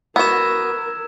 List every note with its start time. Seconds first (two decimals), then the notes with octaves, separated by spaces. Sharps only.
0.16 B3 F#4 A#4 E6 G#6 E7